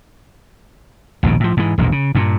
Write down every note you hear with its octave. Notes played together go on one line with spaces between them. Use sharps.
A#1 D#2 G#2 B2
A2 F3
G#2 E3
E1 A#1 F2 A#2
C#3
G2 A#2